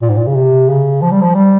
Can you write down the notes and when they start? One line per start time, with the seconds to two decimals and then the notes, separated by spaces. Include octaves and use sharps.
0.02 A#2
0.09 G#2
0.17 A#2
0.27 C#3
0.35 C3
0.69 C#3
1.02 F3
1.11 G3
1.21 F3
1.35 G3